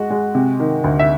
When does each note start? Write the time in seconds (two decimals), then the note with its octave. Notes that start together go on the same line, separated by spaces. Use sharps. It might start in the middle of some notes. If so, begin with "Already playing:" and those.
Already playing: G#3 F#4
0.10 G#3
0.35 C3
0.60 D#3
0.84 D2
0.99 E5